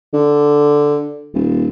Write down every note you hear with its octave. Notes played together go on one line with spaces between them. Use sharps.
D3
D#1